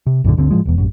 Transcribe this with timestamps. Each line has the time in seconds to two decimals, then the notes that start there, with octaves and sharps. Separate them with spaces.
0.07 C3
0.24 B1 F#2 A2 D3
0.37 G1 D2 D3 C4
0.51 A2 D3 F3 G#3
0.66 E1 E2
0.78 A1 F#2